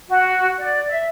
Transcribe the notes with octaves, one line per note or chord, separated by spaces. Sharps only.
F#4
D5
E5